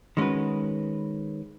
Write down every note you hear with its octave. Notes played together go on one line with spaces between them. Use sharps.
D#3 G#3 C#4 F#4 B4